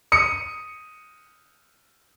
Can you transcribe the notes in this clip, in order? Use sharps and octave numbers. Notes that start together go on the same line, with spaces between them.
D#6 C#7